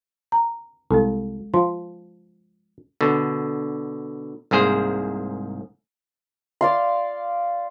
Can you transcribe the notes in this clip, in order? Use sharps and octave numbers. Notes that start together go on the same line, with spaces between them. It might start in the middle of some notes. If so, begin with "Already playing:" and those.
A#5
C2 G#3 A4
F3 F5 C6
B2 D3
C2 G#2 A#3 G#4 C5
D5 F5 C6